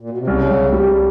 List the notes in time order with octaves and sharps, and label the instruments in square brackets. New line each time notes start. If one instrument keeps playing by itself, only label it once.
[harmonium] A#2
B2
C3
[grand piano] C2 [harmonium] C#3
[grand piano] C2
G3